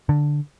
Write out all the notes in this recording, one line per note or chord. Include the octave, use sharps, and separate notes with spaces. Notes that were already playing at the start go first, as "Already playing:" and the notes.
D3